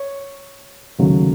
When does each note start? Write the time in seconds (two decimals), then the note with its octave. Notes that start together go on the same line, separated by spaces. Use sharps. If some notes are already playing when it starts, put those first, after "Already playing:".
Already playing: C#5
0.99 D#2 C#3 F#3 A3